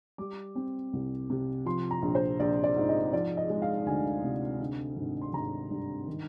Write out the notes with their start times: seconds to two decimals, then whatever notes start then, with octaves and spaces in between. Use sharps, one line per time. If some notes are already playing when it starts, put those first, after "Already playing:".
0.18 G3 D6
0.55 C4
0.93 C2
1.30 C3
1.66 F3 C6
1.91 A#5
2.02 A#1
2.15 C5
2.40 A#1 D5
2.64 D5
2.76 G#2
2.89 D#5
3.13 F3 D5
3.37 D#5
3.50 G#3
3.62 F5
3.86 D2 G#5
4.24 C3
4.60 D3
4.97 G#1
5.21 C6
5.33 G#1 A#5
5.71 G2
6.07 D#3